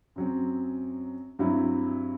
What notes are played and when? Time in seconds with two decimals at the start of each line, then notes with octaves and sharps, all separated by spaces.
0.16 F#2 F#3 C4
1.39 G2 F#3 C4 E4